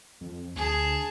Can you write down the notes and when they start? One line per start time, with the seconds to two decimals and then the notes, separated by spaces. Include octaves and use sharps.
0.21 F2
0.56 D2 G#4 A5